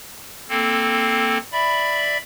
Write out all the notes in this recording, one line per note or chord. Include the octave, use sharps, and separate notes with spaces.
A#3 C4 A4
D5 E5 B5